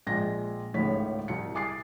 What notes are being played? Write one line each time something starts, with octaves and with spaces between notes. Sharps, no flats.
A#1 G#3 A#6
G#1 C#2 A2 C#5 B6
C2 C#7
G#5 D6 D#6 A6 C7